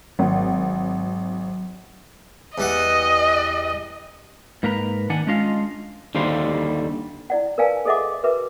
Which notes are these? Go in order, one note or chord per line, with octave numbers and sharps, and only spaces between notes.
G#1 F#3
E2 G3 D#5 F#5
G#2 A#3 A#4 B4 A#5
D#3 D4 F#5 G#5
G#3 C#4 D4 F4 D#5 F5
D#2 D3 G3 C5 F5
E4 D5 F#5
A#4 B4 D5 F5 G#5 A5
G#4 A4 D#5 E5 F#5 D6
F#4 A#4 B4 E5 D6